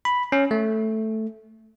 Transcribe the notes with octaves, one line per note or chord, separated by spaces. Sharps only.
B5
C#4
A3